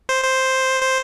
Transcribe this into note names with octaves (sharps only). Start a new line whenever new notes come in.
C5
C5
C5